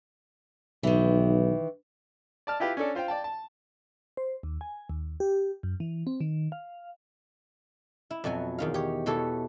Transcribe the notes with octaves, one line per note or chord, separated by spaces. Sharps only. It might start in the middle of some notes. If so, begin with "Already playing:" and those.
B1 D#3 E3
D5 A5 F6
E4 F4 G4 B4
C#4 D4 A4 D5
F4 C5 F5 G5
D5 G5 A5
A5
C5
D#2
G#5
D#2
G4
F#2
E3
C4
D#3
F5
E4
F2 B2 F#3 G#5
E2 D#3 F5
G4 C#5
B2 E3 G4 A4 C#5